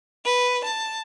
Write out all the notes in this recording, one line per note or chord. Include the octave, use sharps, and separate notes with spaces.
B4
A5